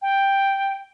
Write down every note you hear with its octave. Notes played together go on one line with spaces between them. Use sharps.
G5